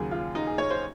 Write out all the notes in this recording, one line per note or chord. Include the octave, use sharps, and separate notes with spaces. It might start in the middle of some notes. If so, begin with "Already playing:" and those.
Already playing: D#2 C#3 F#3 G#4
F4
D#4
G#4
C#5
C5